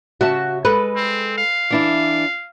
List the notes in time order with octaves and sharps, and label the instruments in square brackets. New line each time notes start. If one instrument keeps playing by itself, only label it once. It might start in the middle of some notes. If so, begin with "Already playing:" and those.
[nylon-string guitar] C#3 E5 A5 [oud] F#4
[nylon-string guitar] G#3 A4 [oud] B4
[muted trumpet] C4
F5
[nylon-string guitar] E3 D4 E4